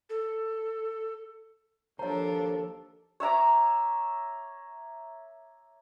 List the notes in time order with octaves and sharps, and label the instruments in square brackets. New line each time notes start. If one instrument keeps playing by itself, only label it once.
[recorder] A4
[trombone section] D#2 A4 [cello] F3 D4 [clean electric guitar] C5 [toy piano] C#5 A#5
[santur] C#5 E5 A#5 D6